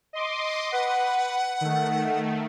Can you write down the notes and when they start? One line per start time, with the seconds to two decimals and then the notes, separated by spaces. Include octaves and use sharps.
0.13 D#5 C6 D6
0.72 B4 F#5
1.61 D#3 A3